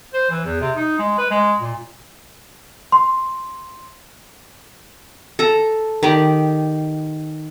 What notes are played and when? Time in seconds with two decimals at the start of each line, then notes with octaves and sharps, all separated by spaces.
0.14 C5
0.31 E3
0.45 E2
0.61 C3
0.76 D#4
0.99 G#3
1.18 B4
1.31 G#3
1.60 A#2
2.92 C6
5.39 A4 A#5
6.03 D#3 G4 D5 D#5